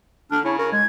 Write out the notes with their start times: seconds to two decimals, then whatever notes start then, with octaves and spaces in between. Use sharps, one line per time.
0.31 D3 D4 F6
0.44 C#3 E4 C#5
0.58 A#4 C#6
0.72 G#3 G#6